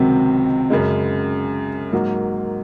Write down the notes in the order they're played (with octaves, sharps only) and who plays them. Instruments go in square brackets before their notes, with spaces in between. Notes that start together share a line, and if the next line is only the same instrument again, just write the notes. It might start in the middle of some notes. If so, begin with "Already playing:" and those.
Already playing: [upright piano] C#2 C3 D#3 F#3 C4
F#2 C#3 G#3
G#2 F#3 A#3